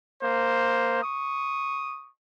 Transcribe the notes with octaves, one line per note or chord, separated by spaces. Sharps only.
A#3 C5
C#6 D#6